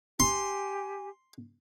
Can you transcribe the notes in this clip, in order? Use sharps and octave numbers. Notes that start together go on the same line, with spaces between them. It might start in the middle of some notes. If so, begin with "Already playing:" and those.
G4 G#5 C6